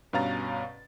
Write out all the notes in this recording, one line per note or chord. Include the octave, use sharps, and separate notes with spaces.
G2 B2 C#4 F5 A#5 A6